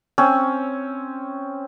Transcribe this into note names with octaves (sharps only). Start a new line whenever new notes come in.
C4 C#4